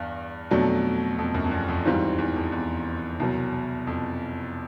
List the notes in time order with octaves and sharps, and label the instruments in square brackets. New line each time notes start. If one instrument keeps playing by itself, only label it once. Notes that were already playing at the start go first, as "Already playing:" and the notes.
Already playing: [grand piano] E2 [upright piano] G2
[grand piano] F2 [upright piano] B2 F#3 A3 D4
[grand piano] F2
F#2
F2
E2
F2
[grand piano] E2 [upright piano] G#2 E3 G3 C4 F4
[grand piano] E2
F2
E2
[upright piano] C2 B2 F#3
[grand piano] F2